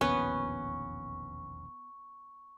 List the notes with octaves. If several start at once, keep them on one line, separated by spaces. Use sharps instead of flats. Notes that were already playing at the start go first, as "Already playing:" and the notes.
E1 A#1 D#2 B3 C#4 C#6